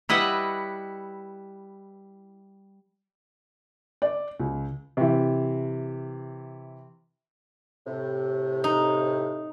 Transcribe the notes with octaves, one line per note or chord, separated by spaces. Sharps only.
G3 E4 B4 D#5 F#5
D5
C#2
C3 E3
A2 C3
D#4